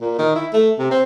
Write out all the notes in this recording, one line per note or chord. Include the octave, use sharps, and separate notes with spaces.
A#2
D#3
E4
A3
C3
C4